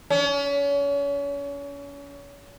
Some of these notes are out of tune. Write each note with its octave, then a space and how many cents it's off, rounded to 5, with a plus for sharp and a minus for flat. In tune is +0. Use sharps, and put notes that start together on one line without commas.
C#4 +35